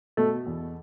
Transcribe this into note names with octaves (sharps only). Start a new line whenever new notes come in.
B2 A3
E2